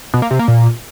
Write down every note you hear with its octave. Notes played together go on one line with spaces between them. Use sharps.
B2
A#3
C3
A#3
A#2